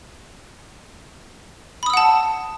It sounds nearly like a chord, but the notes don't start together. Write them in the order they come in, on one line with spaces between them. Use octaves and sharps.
B5 D#6 E6 F#5 A5